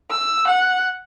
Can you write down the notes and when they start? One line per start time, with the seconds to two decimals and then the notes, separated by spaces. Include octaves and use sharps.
0.11 E6
0.47 F#5